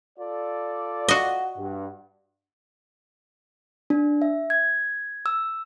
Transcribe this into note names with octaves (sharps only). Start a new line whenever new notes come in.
F4 A4 D5
F#4 D#5
G2
D4
E5
G#6
E6